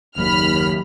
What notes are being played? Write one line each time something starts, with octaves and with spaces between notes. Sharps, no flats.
F#1 D#2 F#3 A#3 B5 F6